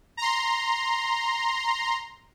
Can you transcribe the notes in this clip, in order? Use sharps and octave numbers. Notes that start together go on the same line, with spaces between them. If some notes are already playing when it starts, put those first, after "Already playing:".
A#5 C6